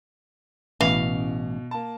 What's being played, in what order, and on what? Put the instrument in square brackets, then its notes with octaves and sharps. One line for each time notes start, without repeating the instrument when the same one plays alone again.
[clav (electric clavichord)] A1 [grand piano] B2 [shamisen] E3 [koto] F5
[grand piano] A#3 A5